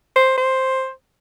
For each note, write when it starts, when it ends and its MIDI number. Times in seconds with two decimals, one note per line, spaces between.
0.16 0.34 72
0.38 0.90 72